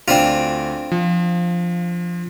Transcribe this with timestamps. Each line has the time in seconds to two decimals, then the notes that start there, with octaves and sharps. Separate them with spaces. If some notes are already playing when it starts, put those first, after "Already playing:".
0.08 D2 C4 D4 F4
0.92 F3